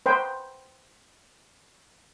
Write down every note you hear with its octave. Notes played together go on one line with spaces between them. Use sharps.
B4 C5 G5